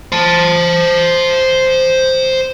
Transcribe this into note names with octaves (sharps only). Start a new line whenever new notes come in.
C5 A5